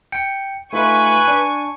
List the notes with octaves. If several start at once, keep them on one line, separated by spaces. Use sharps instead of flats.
G5 C#7
A3 D#4 F4 B4 G#5 C#6
D4